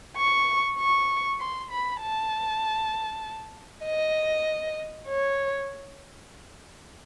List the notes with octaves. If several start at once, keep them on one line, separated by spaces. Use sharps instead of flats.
C#6
C#6
C6
B5
A5
D#5
C#5